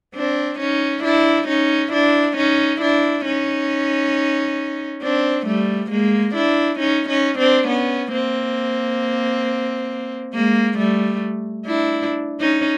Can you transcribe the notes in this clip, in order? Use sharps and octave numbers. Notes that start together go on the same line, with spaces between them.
C4 D4
C#4 D#4
D4 E4
C#4 D#4
D4 E4
C#4 D#4
D4 E4
C#4 D#4
C4 D4
G3 A3
G#3 A#3
D4 E4
C#4 D#4
C#4 D#4
C4 D4
B3 C#4
A#3 C4
G#3 A#3
G3 A3
D4 E4
C#4 D#4